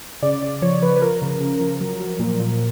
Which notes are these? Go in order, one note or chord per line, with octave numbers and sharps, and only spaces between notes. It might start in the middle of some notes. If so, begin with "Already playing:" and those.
C#3 D5
C#3 D5
F3 C#5
F3 B4
B4
F3 A#4
C#3
C#3
F3
F#3
F#3
A#2
A#2